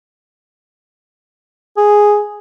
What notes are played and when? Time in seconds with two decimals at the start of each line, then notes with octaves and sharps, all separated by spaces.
1.77 G#4